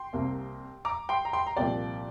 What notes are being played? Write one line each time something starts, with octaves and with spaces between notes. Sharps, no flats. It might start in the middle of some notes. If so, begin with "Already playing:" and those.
Already playing: G5 C6
C2 C3 A#3
A#5 D6
G5 C6
A#5
G5 C6
A#5
C2 A#2 F3 D5 G5